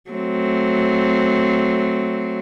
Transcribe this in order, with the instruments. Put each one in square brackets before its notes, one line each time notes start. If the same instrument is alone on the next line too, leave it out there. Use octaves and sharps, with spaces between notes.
[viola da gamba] F#3 A3 C4